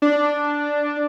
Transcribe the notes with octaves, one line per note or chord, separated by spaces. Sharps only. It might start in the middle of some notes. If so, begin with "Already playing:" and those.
D4